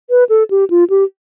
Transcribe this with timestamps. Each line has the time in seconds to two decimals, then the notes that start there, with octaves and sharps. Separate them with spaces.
0.10 B4
0.29 A4
0.51 G4
0.70 F4
0.90 G4